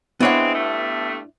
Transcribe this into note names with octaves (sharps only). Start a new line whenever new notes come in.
G#3 B3 C4 D4 E4 C#5 F#5
G2 A3